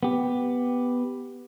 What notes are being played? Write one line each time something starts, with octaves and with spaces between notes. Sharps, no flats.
B3 G4